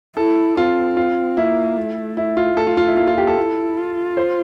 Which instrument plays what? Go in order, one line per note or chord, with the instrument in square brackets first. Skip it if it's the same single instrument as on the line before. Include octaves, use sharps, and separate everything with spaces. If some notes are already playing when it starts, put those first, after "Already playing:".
[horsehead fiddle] E4 [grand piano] A4
[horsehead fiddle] C4 [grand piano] F4
[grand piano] F4
[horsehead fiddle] A#3 [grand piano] E4
[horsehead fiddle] A3
[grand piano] E4
F4
[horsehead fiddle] A3 [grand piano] A4
[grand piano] F4
F4
E4
[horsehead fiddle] A#3 [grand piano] F4
[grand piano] F4
G4
A4
[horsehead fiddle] E4
F4
[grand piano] C5